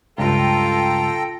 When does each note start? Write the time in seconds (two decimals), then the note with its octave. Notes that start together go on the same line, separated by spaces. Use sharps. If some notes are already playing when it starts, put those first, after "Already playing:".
0.18 C#2 G2 F4 A4 G5 A#5